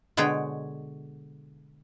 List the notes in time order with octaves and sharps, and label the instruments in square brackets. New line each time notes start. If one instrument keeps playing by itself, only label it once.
[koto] B2 D3 G#3 G#4 C#5 G5